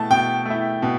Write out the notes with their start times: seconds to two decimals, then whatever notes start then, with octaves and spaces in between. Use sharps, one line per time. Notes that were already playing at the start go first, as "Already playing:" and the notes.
Already playing: B2 A3 E4 A5
0.10 B2 G5
0.45 A3 E4
0.82 B2